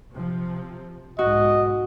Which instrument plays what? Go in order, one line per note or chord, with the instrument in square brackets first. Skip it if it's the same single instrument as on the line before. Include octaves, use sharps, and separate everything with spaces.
[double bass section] C3 F3
[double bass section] B1 G#2 [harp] F#4 [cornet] D#5